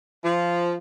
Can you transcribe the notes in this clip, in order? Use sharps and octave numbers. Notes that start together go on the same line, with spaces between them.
F3